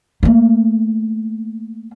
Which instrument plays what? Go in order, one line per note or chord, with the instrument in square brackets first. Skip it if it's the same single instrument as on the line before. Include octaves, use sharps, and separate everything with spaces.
[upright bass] A3 A#3